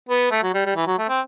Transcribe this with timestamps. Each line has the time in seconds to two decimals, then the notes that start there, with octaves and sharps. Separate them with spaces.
0.09 B3
0.31 A3
0.43 F#3
0.54 G3
0.66 G3
0.76 E3
0.87 F#3
0.99 A3
1.09 C4